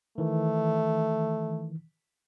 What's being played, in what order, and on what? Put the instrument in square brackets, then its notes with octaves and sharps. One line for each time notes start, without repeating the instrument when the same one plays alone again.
[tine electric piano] D#3 E3 [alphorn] A3